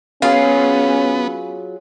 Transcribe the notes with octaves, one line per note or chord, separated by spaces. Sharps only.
F#3 B3 C#4 F4 G#4 F5